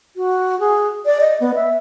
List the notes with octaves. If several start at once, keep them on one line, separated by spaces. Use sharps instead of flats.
F#4
G#4
D5
D#5
B3
E5